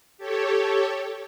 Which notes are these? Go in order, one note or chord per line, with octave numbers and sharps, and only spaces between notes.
G4 A4 C#5